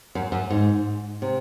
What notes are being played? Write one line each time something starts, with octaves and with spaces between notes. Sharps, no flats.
F#2
F#2
G#2
C3